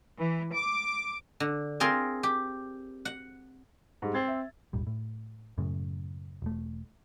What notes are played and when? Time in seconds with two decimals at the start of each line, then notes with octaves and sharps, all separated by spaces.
0.18 E3
0.53 D6
1.40 D3
1.80 C4 F4 G#4 A#4 C5 C6
2.23 G4
3.05 F#5
4.02 G#2 G3
4.14 C4 G#6 A6
4.28 E5
4.73 D#1 G#1 G3
4.87 A2
5.58 F#2 A2 C#3
6.42 E1 A3